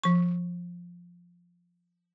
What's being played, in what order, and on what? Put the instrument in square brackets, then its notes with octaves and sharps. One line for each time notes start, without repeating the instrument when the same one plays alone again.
[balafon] F3 C#6